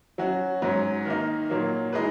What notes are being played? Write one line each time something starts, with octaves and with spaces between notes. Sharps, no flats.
F#3 C#4 F#4
G#2 F#3 C#4
D#3 A#3 D#4
A#2 F#3 A#3
E3 G#3 D#4 G#4 B4